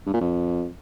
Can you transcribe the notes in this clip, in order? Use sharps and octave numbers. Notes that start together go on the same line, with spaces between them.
G2
A#2
F2